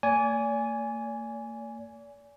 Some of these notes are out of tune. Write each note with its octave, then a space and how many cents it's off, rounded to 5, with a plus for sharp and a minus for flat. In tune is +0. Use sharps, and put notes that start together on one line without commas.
A#3 -45 D5 -35 G#5 +0